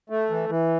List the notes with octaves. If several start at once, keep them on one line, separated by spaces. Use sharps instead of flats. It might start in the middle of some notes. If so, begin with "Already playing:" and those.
A3
E3
E3